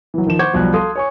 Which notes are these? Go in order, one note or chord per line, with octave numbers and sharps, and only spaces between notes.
E3 F#3
D#3 F3 E7
C5 F#5 C#6 D6 G6 G#6
B1 F3 G3 F#6
A4 F5 C6 D#6
C#5 G#5 C#6